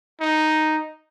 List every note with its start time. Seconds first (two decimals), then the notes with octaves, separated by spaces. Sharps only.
0.20 D#4